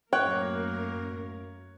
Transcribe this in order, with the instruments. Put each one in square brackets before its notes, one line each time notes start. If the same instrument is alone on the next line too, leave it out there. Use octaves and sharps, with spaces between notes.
[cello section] F#2 A2 A#4 [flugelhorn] A#3 [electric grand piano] C#5 F#6 [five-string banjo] G5